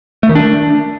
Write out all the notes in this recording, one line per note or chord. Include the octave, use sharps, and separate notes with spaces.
A3
D#3
D4